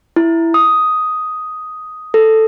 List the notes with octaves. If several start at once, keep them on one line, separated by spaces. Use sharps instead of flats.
E4
D#6
A4